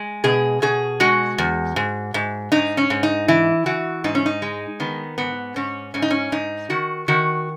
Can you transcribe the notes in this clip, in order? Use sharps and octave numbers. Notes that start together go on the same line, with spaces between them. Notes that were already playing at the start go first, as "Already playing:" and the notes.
Already playing: G#3
B2 G#4
B2 G#4
G#3 F#4
E2
G#2
G#2
G#2 D#4
C#4
G#2
D#4
E3 E4
E3 F#4
G#2 D#4
C#4
D#4
G#3
D#3 B3
G#2 B3
G#2 C#4
G#2 C#4
D#4
C#4
G#2 D#4
D#3 F#4
D#3 F#4